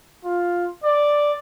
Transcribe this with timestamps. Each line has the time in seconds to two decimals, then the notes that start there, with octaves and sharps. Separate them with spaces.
0.25 F4
0.84 D5